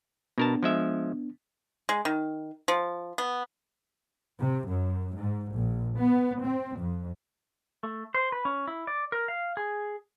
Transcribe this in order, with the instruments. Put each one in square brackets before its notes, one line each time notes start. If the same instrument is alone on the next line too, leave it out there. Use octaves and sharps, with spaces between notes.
[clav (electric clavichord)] B2 A#4 A5 [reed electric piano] B3 D4
[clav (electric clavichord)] F3 G#3 E5
[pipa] G#3
D#3
F3
B3
[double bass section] C3
F#2
G#2
A#1
B3
C4
F2
[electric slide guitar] A3
C5
B4
C#4
E4
D5
A#4
F5
G#4